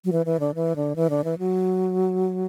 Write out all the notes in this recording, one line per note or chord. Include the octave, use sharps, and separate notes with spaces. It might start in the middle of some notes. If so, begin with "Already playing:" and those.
F#3
E3
E3
D3
E3
D3
E3
D3
E3
F#3